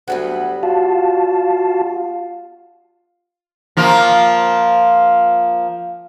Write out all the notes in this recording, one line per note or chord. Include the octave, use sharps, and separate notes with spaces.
D2 F#3 G3 B3
F4 F#4 F5 A5
F3 A#3 F4